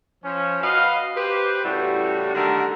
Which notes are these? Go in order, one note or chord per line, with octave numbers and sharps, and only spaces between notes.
F3 C#4
F#4 B4 D#5 F5
G4 B4 C5
A2 C#3 G3 E4 F#4
D3 D#3 G3 A3 F#4 A#4